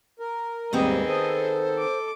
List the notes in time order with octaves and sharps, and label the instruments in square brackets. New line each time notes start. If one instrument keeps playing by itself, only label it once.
[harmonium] A#4
[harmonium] D#2 G#2 G3 [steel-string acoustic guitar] D#3 B3 C4 [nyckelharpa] G#4 D#5
[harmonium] A4 [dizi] C5
[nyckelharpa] D6